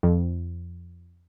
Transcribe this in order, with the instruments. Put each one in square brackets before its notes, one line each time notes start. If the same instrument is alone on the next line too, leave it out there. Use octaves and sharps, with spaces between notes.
[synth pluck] F2